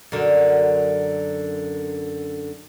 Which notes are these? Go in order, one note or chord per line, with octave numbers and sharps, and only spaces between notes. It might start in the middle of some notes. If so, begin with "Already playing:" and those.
F#2 D3